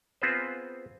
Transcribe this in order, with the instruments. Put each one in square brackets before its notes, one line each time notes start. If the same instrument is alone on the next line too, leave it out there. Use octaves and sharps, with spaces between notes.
[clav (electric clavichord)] B3 C4 F4 G#4 B4 C5